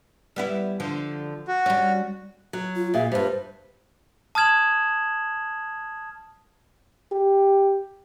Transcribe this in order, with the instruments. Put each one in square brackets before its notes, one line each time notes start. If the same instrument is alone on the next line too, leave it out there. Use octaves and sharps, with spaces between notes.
[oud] G3 B3 E4
D3 F3
[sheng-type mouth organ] F#4
[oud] G3 C#4
[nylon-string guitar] F#3
[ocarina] F4
[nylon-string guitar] A#2 G#4 F5 [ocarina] E5
[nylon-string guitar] G2 G3 [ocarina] C5
[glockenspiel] A5 D#6 F6 G#6 E7 F#7
[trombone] G4